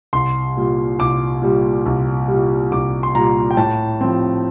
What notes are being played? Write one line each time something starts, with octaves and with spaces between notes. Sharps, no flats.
C2 C6
A#2 G3
C2 D6
A#2 G3
C2
A#2 G3
C2 D6
C6
A#2 G3 A#5
G5
A2 A5
F3 C4